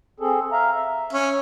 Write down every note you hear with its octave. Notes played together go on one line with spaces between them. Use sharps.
C4 G#4 A4
E5 F5 A#5
E5
C#4